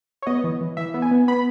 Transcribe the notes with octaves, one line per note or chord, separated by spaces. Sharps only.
C#5
B3 D#5
E3
E3
E3 E5
B3
G#5
B3
B3 B5